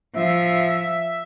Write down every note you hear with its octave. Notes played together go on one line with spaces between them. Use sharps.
F3 E5